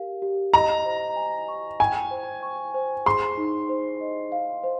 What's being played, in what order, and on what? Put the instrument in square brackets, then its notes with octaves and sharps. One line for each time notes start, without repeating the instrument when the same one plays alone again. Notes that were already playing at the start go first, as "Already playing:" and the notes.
Already playing: [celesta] G4 A#4 F5
G4
[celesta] D#5 [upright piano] A#5
[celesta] C5
G#5
C#6
[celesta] G5 [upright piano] G#5
[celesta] C5
C#6
C5
[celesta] G#4 [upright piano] C6
[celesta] D#4
C5
D#5
F5
C5